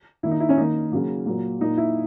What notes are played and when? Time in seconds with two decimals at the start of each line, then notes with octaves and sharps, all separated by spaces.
0.23 D#3 A#3 E4
0.31 D#4
0.40 E4
0.49 C#4
0.57 D#3 A#3 D#4
0.92 C#3 F#3 A#3
1.26 A#2 F#3 A#3
1.60 A#2 A#3 D#4
1.77 E4